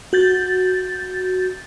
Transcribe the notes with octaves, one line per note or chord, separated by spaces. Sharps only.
F#4 G6 A6